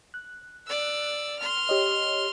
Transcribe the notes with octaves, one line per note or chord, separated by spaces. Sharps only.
F#6
D5 E6
C6 F6
G4 C#5 D#5